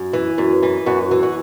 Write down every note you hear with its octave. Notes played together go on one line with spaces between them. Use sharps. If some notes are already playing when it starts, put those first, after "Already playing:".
Already playing: F#2
E3
F#2
E3
F#2 F#4
E3
F#4